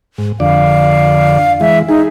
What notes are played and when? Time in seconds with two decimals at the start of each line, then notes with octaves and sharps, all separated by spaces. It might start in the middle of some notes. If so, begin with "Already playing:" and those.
0.18 G#2
0.40 F2 D3 D5 F5
1.61 E3 G#3 E5
1.88 D#4 G#4